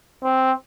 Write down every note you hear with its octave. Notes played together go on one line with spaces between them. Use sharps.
C4